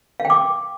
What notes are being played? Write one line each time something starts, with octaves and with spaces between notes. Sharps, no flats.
F5
G5
D6